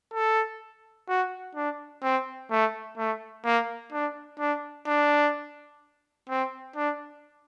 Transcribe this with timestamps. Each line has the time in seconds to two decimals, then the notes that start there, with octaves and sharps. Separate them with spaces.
0.14 A4
1.09 F#4
1.55 D4
2.03 C4
2.51 A3
2.98 A3
3.45 A#3
3.93 D4
4.39 D4
4.87 D4
6.29 C4
6.76 D4